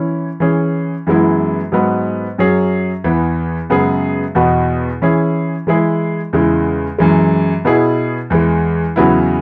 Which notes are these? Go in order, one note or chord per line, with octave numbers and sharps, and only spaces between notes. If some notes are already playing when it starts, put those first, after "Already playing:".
Already playing: E3 C#4 E4
E3 C#4 G#4
F#2 E3 G#3 B3 E4
G#2 F#3 B3
F#2 F#3 C#4 G#4
E2 E3 B3
F#2 C#3 G#3 B3 G#4
E2 B2 B3 F#4
E3 C#4 E4 G#4
E3 G#3 E4 G#4
E2 C#3 G#3 E4
F#2 E3 G#3
B2 B3 E4 G#4
E2 E3 G#3
E2 C#3 F#3 B3 E4